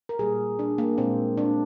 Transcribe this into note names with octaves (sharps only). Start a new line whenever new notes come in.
A#4
A#2 G3 A#3 G#4
D4
A#3
A#2 G#3 C4
D4